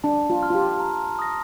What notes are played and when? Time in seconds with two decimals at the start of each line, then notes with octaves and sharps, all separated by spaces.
0.04 D4 A5
0.30 F4
0.43 C6 F6
0.50 F4
0.55 G4
0.80 A#5
1.19 D#6 A#6